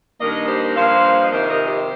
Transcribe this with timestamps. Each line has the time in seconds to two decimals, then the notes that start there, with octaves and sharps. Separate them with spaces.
0.20 G2 D#3 A#3 A#4 D#5
0.48 G4 C5
0.76 G2 F3 A#3 C5 F5
1.23 D#5
1.31 F2 C3 D#3 G4 C5
1.49 A#4 D#5
1.68 G4 C5